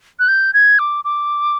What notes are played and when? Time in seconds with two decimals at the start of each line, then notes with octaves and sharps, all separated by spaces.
0.19 F#6
0.28 G6
0.54 G#6
0.79 D6
1.05 D6